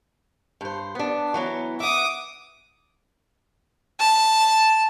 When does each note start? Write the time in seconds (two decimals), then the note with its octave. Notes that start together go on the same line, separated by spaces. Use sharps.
0.61 G2 C5
0.95 B3 D4
1.34 E3 F#3 B3
1.80 E5 F#5 D6 D#6
3.99 A5